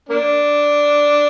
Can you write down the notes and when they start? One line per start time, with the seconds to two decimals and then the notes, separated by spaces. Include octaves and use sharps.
0.09 A#3 D4